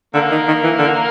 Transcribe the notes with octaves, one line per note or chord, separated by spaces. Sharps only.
D3 A#3
D#3
D#3
E3
D3